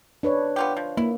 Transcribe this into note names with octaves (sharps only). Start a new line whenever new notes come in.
D4 B4 C#5
B3 F4 G4
F3
A#3 E4